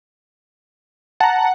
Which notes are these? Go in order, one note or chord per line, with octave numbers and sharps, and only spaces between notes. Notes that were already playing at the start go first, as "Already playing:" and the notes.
F#5 A5 A#5